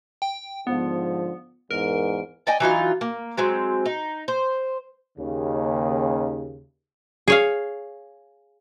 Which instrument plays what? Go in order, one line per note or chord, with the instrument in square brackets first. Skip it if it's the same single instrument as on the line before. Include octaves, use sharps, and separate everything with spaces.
[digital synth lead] G5
[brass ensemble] G#2 D3 F3 [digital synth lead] B3
[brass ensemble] E2 G#2 [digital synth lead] A#4
[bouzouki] D5 D#5 G5 G#5
E3 F#3 D#4 F4
A#3
F#3 G#3 C4
D#4
C5
[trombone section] D#2 C#3
[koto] G#4 C#5 F5